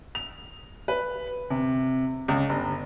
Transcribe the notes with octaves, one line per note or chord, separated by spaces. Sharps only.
F7
B4
C3
C#2
G1